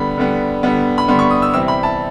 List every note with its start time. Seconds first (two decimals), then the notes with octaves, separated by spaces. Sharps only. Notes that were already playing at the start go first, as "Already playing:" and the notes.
Already playing: D3 G3 B3 B5
0.18 D3 G3 B3
0.63 D3 G3 B3
0.98 B5
1.08 D3 G3 B3 C6
1.19 C#6
1.31 D#6
1.42 E6
1.54 C3 E3 G3 C4 E6
1.68 B5
1.83 A5